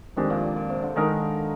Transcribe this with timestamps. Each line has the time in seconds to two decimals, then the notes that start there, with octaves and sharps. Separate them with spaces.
0.16 F2 C3 D#3 G#3 D4 G4
0.30 A#2
0.43 A#2
0.56 A#2
0.70 C3
0.82 D3
0.96 D3 D#3 G#3 D#4 A#4